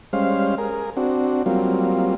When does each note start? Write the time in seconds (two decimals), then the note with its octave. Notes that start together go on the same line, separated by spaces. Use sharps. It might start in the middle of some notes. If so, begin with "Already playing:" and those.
0.13 G3 G#3 C#4 C5 F5
0.58 G#4 A#4
0.97 C4 D4 F#4
1.46 F#3 G3 A#3 C4 F4